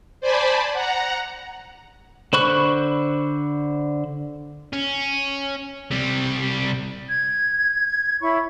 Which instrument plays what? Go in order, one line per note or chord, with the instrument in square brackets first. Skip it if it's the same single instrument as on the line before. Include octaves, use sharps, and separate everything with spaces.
[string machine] C5 D5 G#5 A5 B5
F#5 A#5
[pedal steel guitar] D3 C5 B5 C#6 F#6
[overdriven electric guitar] C#4
C3 G3
[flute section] G#6
E4 C#5 B5 C#6